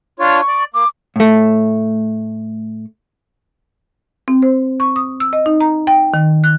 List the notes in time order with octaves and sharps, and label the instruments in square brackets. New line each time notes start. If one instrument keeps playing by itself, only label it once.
[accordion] D4 F4 C#5
[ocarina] C#6
[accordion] D5
[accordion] A#3 [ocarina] D6
[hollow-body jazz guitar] A2 A3
[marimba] C4
C5
C#6
D#6
E6
D#5
D#4
A#5
G5
D#3
F#6